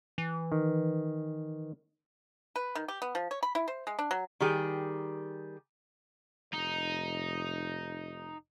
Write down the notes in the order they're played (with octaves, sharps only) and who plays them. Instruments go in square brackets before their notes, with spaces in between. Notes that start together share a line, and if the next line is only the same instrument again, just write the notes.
[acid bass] E3
[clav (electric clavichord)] D#3
[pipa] B4
D#3
G4
B3
F3
C#5
B5
E4
C5
G#3
D4
F#3
[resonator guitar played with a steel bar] D#3 G3 G4 G#4
[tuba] F1 [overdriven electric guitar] D#4